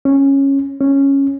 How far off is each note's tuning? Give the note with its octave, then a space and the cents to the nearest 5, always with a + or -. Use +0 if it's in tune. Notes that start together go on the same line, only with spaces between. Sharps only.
C#4 -10
C#4 -5